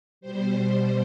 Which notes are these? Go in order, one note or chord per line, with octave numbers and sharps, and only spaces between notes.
B2 G3 C5